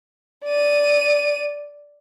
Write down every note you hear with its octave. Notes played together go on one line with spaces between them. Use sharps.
D5 D#7